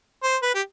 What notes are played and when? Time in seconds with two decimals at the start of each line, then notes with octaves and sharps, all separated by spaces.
0.23 C5
0.43 B4
0.55 G4